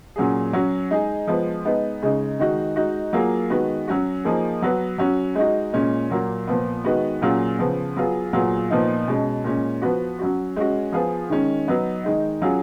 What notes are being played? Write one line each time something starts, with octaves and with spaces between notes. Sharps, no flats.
A#2 F#3 C#4 G#4
F#3 C#4 F#4
G#3 D#4 G#4
F3 G#3 B3
G#3 B3 D#4
C#3 G#3 D#4
D#3 G#3 D#4 F#4
G#3 D#4 F#4
F#3 A#3 F4 G#4
D#3 G#3 B3 F#4
F#3 C#4 F#4
F3 A#3 D#4 G#4
F#3 B3 F#4
F#3 C#4 F#4
G#3 D#4 F#4
A#2 G#3 C#4
A#2 F#3 A#3
A#2 F3 B3
D#3 G#3 B3 F#4
A#2 F#3 C#4 F4 G#4
C#3 F3 B3
F#3 B3 F4 G#4
A#2 F#3 B3 F4 G#4
A#2 F3 B3 D#4
B2 G#3 C#4
A#2 G#3 C#4
F3 B3 F#4
F#3 C#4 F#4
G#3 C#4 F#4
F3 B3 F4 G#4
D#3 G#3 C#4
F#3 B3 D#4
D#3 G#3 D#4
F#3 C#4 F4 G#4